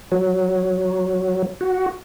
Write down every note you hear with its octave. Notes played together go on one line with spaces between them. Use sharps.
F#3
F#4